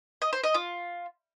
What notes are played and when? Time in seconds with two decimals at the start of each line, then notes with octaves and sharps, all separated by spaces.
0.22 D#5
0.33 C5
0.44 D#5
0.54 F4